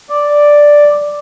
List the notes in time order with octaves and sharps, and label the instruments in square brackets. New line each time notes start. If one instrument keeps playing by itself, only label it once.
[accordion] D5